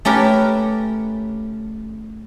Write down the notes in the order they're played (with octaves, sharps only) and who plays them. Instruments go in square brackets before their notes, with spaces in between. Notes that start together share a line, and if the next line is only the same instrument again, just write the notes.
[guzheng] A3 C#4 G4 A#4 B4